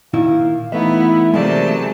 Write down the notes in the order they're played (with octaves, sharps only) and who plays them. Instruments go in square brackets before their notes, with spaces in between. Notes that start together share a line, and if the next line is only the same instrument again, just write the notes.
[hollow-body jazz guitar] A#2 D#3 E4 [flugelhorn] F5
[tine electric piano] E3 A3 D#4 [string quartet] B3 [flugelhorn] E4 [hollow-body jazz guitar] E5
[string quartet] C3 F#3 A5 [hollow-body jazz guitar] G#3 A#3 D5 [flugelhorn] G#4